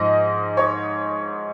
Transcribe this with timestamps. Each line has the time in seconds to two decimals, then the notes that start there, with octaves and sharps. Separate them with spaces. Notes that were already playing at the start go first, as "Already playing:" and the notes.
Already playing: G#2 F3 D#5
0.57 C#5